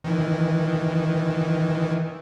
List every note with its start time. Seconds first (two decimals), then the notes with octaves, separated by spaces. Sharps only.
0.04 D#3 E3